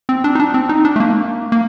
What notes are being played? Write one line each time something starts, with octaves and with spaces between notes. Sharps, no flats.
C4
D4
D#4
D4
C4
D#4
D4
A3
A#3
A#3